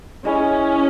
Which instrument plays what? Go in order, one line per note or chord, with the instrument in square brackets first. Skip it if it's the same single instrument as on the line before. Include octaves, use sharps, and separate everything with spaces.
[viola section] C#4 [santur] E4 G#4 D#5